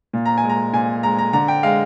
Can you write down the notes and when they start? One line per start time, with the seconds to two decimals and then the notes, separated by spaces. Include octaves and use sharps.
0.13 A#2
0.25 A#5
0.38 G#5
0.44 G#3
0.49 A#5
0.73 A#2 G#5
1.03 G#3 A#5
1.18 A#5
1.33 D3 A#5
1.48 G5
1.63 G#3 F5